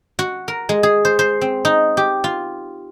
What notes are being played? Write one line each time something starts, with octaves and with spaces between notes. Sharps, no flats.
F#4
A#4
G#3
G#4
C5
C5
C4
D#4
G4
F4